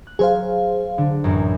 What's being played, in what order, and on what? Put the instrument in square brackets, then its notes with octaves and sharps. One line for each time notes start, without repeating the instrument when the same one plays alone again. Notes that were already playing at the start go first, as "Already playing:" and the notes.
[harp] F#6
[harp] F#3 [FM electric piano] G#4 C5 F5
[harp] D3
A1 F#2